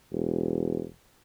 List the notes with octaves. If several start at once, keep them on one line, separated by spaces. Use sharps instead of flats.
E1